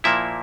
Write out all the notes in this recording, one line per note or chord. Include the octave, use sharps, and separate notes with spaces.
A#2 F3 A#3 E4 E5